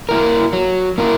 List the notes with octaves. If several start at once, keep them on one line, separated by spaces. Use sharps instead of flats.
A#3 E4 A#4
F#3
A#3 E4 A#4